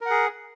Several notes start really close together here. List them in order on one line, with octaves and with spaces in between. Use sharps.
A#4 F#5 G#4